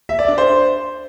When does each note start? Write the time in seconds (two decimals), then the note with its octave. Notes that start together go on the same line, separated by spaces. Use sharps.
0.09 E5
0.19 D5
0.28 D4
0.38 C5